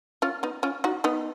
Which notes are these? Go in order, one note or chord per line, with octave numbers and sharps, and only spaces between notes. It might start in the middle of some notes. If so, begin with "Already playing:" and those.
C#4 F4
B3 D#4
C#4 F4
D#4 F#4
B3 D#4